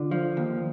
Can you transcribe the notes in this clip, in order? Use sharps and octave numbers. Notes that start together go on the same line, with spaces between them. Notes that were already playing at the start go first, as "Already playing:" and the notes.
Already playing: D3 F4
F3
D#2